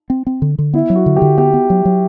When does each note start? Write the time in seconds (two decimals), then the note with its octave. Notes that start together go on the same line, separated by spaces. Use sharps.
0.10 C4
0.27 C4
0.42 D3
0.59 D3
0.74 B3 E4
0.90 F#3
0.95 F#4
1.06 D3
1.16 G4
1.22 D3
1.38 B3 G4
1.54 B3
1.70 F#3
1.85 F#3